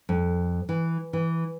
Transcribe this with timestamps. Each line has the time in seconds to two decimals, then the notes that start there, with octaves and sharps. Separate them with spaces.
0.09 F2
0.69 E3
1.13 E3